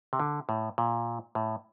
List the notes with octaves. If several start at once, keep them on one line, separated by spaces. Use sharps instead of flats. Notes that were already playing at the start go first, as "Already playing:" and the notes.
C3
D3
A2
A#2
A2